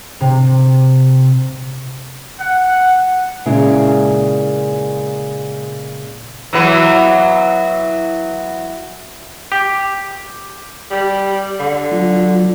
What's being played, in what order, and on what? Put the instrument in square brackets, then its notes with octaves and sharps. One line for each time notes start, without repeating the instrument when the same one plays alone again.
[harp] C3
[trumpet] F#5
[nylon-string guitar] A#2 C#3 G#3 E4
[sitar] E3 F#3 B3
[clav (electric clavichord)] G4
[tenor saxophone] G3
D3
[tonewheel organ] F#3 F4